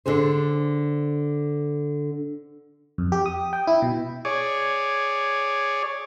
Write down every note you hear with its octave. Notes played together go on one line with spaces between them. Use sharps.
D3 D4 G#4 C5
F2
G4
D#6
G5
E4
B2
G#4 C#5 D5